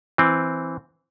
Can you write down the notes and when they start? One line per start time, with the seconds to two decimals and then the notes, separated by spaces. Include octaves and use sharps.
0.18 E3 C4